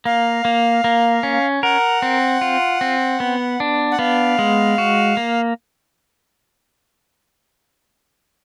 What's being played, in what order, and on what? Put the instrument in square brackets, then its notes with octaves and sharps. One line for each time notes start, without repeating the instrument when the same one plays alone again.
[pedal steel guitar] A#3 [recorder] F5
[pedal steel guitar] A#3
A#3
C#4
[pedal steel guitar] A#4 [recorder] F#5
[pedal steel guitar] C4
F4
C4
B3
D4
[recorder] F#5
[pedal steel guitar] B3 [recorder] F5
[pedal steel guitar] G#3
F#4
A#3